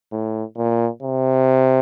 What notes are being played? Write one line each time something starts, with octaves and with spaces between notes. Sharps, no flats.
A2
A#2
C3